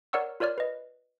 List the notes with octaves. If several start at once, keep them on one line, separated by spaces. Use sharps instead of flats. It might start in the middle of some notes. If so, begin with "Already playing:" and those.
A#4 C#5 D5 F#5 C#6 E6
F4 A#4 C#5 D5 F6
B4 D#5